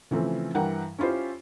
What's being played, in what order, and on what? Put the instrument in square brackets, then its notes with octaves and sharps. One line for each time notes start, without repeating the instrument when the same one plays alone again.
[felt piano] C#3 E3 F3 A3 C4
G2 E3 A#4 F#5 G5 A#5
C#4 E4 F4 G4 C5